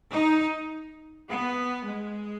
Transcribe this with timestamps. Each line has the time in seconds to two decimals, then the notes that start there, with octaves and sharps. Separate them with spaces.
0.13 D#4
1.29 B3
1.86 G#3